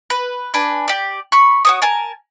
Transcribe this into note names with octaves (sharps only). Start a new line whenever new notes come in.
B4
D4 B4 G#5
G4 D5
B5 C#6
F#4 C#5 D#6
A#4 G#5 A5